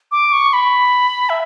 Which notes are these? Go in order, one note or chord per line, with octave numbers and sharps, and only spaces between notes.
D6
C#6
B5
E5